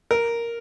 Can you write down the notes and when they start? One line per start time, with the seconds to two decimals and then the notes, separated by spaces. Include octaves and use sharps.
0.11 A#4